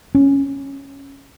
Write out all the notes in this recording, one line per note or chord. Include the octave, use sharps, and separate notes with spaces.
C#4